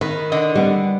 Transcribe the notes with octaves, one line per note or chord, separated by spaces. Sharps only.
D#3 B4
D3 D#5
G3 B3